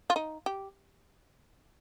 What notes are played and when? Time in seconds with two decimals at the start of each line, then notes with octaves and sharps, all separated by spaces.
0.10 F4
0.16 D#4
0.46 G4